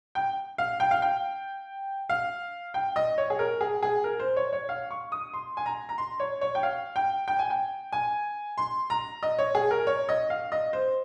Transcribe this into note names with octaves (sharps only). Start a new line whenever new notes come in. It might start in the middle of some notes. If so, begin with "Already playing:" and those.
G5
F5
G5
F5
G5
F5
G5
D#5
C#5
G#4
A#4
G#4
G#4
A#4
C5
C#5
C#5
F5
C#6
D#6
C6
G#5
A#5
A#5
C6
C#5
C#5
G5
F5
G5
G5
G#5
G5
G#5
C6
A#5
D#5
C#5
G#4
A#4
C#5
D#5
F5
D#5
C5